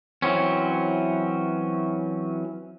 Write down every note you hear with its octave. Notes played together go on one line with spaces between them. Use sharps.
E3 F#3 C4 C#4